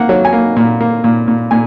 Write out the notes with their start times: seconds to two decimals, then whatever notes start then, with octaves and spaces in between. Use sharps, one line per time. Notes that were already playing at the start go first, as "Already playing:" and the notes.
Already playing: A#3 F#5
0.09 F#3
0.25 G#5
0.33 A#3
0.57 A#2
0.80 A#3
1.04 A#2
1.28 A#2
1.51 A#2 G#5